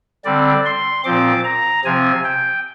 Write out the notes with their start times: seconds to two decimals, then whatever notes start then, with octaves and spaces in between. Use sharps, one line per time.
0.25 D3 G3 C4 D5
0.65 C6
1.04 A#2 F3 C4 D6
1.44 A#5
1.85 C3 F3 C4 G#5
2.24 G5